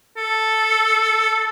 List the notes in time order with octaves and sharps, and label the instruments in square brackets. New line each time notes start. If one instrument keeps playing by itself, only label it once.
[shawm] A4